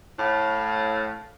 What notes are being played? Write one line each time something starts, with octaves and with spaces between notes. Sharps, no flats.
A2 F5